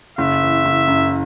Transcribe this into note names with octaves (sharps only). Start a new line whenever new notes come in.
F#1 E5
E3
F#1
F#2